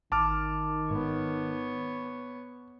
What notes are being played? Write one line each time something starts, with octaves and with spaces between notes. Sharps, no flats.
G#1 D#3 A5 D6 F6
G#2 B3 C#5